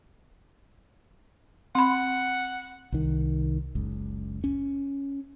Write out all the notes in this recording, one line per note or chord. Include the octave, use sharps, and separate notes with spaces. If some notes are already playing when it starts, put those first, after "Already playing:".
C4 F#5 B5
C2 D#3
F#1 C#2
C#4